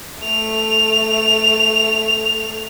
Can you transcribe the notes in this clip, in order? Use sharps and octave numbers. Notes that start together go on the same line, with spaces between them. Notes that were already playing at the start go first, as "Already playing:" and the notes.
A3 F7